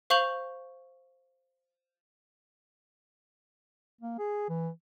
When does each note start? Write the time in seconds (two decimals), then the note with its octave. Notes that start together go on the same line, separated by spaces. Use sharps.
0.10 C5 F5 C#6 G6 F7 F#7
4.01 A#3
4.19 G#4
4.49 E3